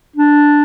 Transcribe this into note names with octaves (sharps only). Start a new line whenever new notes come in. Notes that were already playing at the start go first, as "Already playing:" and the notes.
D4